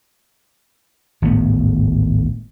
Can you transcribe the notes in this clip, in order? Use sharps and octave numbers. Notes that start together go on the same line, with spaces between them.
G#1 D2 A2 B3